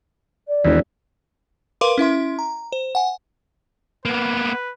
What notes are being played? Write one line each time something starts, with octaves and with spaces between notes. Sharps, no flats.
D5
E1 D#2 E3
A#4 B4 F5 C6 D6
C#4 E4 E5 C6
A#5
C5
F#5 G#5
A#3 B3 B4